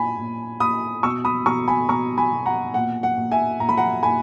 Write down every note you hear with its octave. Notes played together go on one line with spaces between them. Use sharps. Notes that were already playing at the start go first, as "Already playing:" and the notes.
Already playing: A#2 G#5 B5
A#2
A#2 B5 D#6
B2 C#6 E6
B5 D#6
B2 A#5 C#6
G#5 B5
B2 A#5 C#6
G#5 B5
B2
F#5 A#5
A#2 F#5
F#5
A#2
E5 G#5
A#2 A#5
B5
F#5 A#5
A#2 G#5 B5